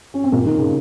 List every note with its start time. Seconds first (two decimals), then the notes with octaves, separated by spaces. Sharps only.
0.14 C#4
0.24 C4
0.32 A#2 A#3
0.46 D#3
0.58 C#3